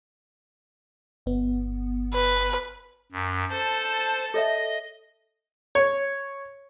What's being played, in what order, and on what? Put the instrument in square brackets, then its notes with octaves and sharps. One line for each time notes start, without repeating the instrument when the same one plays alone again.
[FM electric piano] G1 B3
[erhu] B4
[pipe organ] F#2
[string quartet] A4 A5 [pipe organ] C5
[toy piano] A4 C#5 E5 [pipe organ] D#5
[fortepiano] C#5